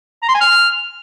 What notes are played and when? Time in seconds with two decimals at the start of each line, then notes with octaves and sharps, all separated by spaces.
0.23 A#5
0.29 C6
0.35 G#5
0.41 F6